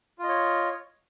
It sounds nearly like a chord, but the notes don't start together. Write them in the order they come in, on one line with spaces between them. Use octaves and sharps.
F4 D#5 C#5